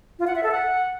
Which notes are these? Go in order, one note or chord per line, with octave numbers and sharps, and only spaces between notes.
F4
F#5
E5
A4
F#5